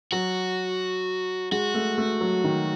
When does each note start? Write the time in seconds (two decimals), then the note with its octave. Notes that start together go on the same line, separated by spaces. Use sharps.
0.12 F#3 F#4
1.52 G#3 F#4
1.74 A3
1.98 A3
2.21 F#3
2.44 D#3